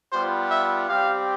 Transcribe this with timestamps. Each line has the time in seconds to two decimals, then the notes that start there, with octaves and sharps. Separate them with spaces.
0.13 G3 B3 F4 C5
0.51 E5
0.88 G3 C4 G4 F5